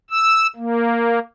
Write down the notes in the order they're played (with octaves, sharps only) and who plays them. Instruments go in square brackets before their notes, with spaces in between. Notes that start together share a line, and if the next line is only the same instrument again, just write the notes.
[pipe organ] E6
A#3